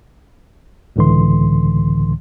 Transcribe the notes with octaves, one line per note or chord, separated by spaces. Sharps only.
C#2 A2 D3 E3 C6